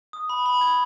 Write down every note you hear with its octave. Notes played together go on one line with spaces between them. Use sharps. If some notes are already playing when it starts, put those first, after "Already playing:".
D#6
B5
B5
G#6